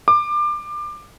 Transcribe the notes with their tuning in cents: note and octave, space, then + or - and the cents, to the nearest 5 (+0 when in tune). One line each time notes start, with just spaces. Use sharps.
D6 +25